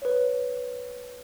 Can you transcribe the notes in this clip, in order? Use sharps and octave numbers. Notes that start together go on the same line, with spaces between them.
B4 C#5